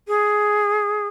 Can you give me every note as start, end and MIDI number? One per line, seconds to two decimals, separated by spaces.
0.08 1.08 68